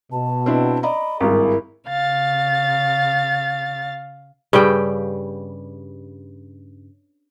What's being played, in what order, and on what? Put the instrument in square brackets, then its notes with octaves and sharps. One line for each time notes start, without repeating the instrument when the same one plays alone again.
[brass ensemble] B2 [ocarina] A5
[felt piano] C4 D4 E4
[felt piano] D5 D#5 A#5 [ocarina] B5
[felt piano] G#1 G2 [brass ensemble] E4 G#4 A#4 [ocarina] A#5
[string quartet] C#3 F5 A6
[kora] G2 C#3 G3 G5